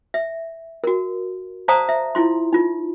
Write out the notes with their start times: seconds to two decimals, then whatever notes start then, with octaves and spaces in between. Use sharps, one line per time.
0.14 E5
0.84 F#4 A#4
1.68 C5 D5 F5 A5 A#5 D#6
1.89 E5
2.15 E4 F4 C6
2.53 D#4 F4